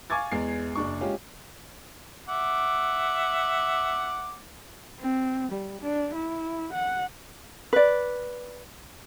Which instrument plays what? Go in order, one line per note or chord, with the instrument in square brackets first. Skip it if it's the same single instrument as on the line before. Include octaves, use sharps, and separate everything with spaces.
[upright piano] F5 G#5 C#6 D6 G#6 A6
E2 G#3 C7
F#1 D4 C#6
G#3 C#4 F4 G4 G#4
[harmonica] E5 F#5 D6
[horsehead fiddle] C4
G3
D4
E4
F#5
[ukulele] B4 D5